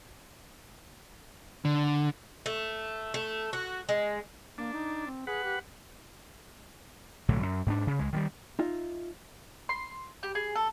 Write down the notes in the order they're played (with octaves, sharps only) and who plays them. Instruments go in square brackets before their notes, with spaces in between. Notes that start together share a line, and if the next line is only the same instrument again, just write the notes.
[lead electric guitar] D3
[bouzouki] A3
A3
F#4
G#3
[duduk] A#3 [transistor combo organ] D4
[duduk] D#4
C4
[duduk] G#4 [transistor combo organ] B4 F#5
[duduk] G4
[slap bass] B1 A2 D3 F#3
F#2
G#2 B3 D4
C#3
C#2 G#3
D#3 F#3 G3
[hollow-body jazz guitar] D#4 F4 E5
[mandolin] C6
G4
G#4
A4